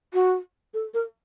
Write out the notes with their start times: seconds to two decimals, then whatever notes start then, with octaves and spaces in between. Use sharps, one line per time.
0.14 F#4
0.74 A4
0.94 A#4